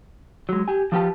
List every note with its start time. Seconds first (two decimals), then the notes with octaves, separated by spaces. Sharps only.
0.49 F#3 G#3
0.68 G4 G#5
0.92 F3 D4 F4 G4 B4 A5